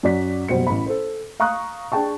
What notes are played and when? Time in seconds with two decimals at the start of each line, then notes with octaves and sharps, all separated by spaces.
0.03 F#2 F#4 D5 B6
0.48 F#1 B2 G3 C5 C#7
0.67 A1 B5
0.86 A4 C5
1.40 F5 A#5 C#6 D#6 F#6
1.92 D4 G#4 G5 A5 C#6